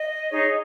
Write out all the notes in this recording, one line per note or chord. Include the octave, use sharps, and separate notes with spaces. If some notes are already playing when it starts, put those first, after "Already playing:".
Already playing: D#5
D#4 G#4 C#5